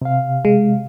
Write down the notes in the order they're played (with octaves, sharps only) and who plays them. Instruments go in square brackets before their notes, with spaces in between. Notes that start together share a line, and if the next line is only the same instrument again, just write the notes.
[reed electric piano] C3 F5
[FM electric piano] G#3